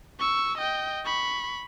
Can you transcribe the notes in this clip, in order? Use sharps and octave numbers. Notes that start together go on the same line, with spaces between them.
C#6 E6
D#5 G5
B5 C#6